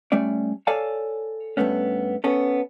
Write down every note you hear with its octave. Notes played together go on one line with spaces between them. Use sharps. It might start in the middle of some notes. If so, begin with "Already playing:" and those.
G3 A3 C#4 D5
A4 C#5 D5 F5 G#5 A5
G2 C3 A3 B3 C#4
B3 C#4 A4